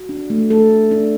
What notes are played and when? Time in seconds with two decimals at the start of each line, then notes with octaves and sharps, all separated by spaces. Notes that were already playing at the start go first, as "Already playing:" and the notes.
Already playing: F#4
0.09 D4
0.30 A3
0.50 A3 A4
0.70 D4
0.91 D4